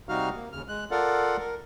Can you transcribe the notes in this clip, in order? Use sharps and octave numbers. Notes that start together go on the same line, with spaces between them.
C3 G3 D#4 F#4 F5 F6
A#3
D#2 C#3 F6
G#3 F#6
F4 A4 A#4 D5 F5 F#5
A#4